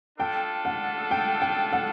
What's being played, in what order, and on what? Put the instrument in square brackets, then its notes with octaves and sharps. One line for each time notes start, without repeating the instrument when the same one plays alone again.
[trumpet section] D4 F4 A4 [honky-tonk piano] G5
[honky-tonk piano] F#5
G5
G5
F#5